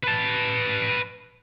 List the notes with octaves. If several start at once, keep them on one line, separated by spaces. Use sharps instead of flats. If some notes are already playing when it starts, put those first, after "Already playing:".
B4 A5